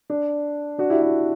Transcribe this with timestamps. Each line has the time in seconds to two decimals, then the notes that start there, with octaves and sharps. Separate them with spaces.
0.10 D4
0.79 D4 F#4
0.90 E4 G4
1.02 E4 G4